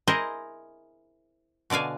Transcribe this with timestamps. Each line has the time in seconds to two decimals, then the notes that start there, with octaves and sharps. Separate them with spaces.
0.08 E4 G#4 A#4 C5 D#5 A#5
1.70 B2 D3 D5 F5 G#5